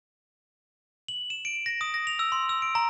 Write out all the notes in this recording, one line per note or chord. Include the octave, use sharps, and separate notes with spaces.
F#7
E7
D7
A#6
D#6
A#6
F7
E6
C6
E6
D7
A#5